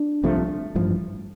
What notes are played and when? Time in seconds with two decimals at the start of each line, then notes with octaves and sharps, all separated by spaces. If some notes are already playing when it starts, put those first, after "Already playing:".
Already playing: D4
0.24 C2 C3 F3 A3
0.75 A1 G2 F3